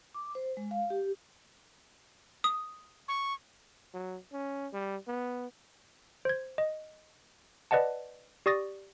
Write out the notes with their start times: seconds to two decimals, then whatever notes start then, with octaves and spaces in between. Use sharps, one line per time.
0.14 D6
0.35 C5
0.57 G#3
0.71 F5
0.90 G4
2.44 D#6
3.08 C#6
3.94 F#3
4.33 C#4
4.73 G3
5.07 B3
6.25 C5 G#6
6.58 D#5
7.71 B4 D5 D#5 F#5 A5
8.46 G4 D5 C#6 D#6 A6 A#6